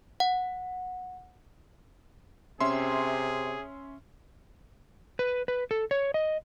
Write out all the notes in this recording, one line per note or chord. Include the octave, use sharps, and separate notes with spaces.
F#5
C3 C#4 G#4 E5 C6
B4
B4
A4
C#5
D#5